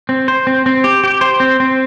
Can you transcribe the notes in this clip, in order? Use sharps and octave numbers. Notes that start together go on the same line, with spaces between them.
C4
C5
C4
C4
G4
G4
C5
C4
C4